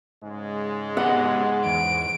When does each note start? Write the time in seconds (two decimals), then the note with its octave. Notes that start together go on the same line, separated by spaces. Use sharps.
0.23 G#2 C#3 G#3
0.97 B3 G4 D#5 F#5
1.66 E2 D7